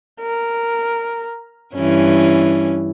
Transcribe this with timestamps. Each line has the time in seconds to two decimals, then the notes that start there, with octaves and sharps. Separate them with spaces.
0.20 A#4
1.75 G2 E3 C#4